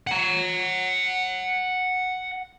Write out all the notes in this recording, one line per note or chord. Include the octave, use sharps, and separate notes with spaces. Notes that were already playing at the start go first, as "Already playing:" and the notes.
F#5 A#5